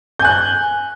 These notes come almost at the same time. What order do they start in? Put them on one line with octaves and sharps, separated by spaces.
G6 G#5 F#6